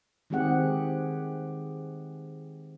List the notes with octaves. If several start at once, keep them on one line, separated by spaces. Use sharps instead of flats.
D#3 G#3 C4 G4 G#4 F#5